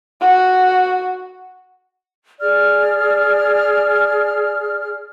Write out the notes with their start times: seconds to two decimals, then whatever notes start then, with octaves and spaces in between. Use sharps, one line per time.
0.21 F#4
2.41 G#4 D5 F6